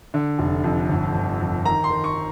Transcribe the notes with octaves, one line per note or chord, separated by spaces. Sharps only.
D3
F1
F2
G1
G1
F2
D#3 A#5
C6
D#3
C#6